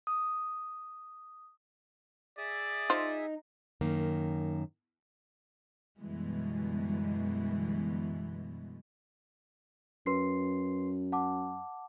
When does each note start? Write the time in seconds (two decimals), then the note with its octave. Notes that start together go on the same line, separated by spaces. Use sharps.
0.07 D#6
2.38 G#4 D5 E5 D#6
2.90 D#4 F4 C5
3.81 F#2 D#3 A#3
5.99 F#2 B2 D3 E3 G3 G#3
10.06 F#2 B4 C6 C7
11.12 F#5 A5 D6